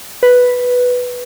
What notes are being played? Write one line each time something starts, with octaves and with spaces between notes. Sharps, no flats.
B4